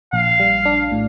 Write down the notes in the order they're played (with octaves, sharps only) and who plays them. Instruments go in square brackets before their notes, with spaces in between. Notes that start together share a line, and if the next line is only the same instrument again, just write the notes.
[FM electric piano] A#1 [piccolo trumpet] F5
[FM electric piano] G3
D4
A2